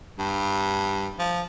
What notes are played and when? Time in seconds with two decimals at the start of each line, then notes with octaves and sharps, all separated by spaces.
0.19 G2
1.19 F3